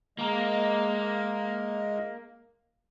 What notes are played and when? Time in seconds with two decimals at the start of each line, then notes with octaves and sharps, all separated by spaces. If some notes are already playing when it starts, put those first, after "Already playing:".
0.19 G#3 A#3 A#4 D#5